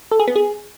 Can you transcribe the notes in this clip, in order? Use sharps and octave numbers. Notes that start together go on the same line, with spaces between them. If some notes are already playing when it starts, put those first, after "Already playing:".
A4
G#4
B3
G#4